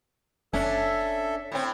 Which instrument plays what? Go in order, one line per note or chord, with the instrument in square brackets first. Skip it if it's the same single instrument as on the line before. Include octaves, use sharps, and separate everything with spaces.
[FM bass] F#1 [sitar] C#4 D4 [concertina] A4 E5
[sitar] A2 C4